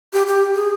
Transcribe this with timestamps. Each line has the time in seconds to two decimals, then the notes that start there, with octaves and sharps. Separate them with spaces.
0.13 G4
0.27 G4
0.54 G#4